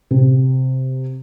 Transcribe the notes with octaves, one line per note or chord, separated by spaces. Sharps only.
C3